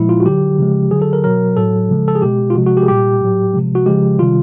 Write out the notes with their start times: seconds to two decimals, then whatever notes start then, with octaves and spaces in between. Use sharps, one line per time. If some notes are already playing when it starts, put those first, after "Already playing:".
Already playing: A#2 F3 G#3 E4
0.09 F4
0.20 F#4
0.25 D3 F#3 G4
0.58 C#3 F3 G#3
0.91 D3 F#3 G#4
1.02 A4
1.13 A#4
1.24 B2 F#3 A#4
1.57 A2 F#3 A4
1.89 C#3 F3 G#3
2.08 A4
2.15 G#4
2.22 B2 G#3 G4
2.50 F4
2.55 C3 F3 G#3 F#4
2.66 F#4
2.77 G4
2.83 G#4
2.88 A#2 G3 G4
3.21 A2 F#3
3.54 C3 F3 G#3
3.75 F#4
3.86 C#3 F3 G#3 G4
4.19 C3 D#3 G3 F4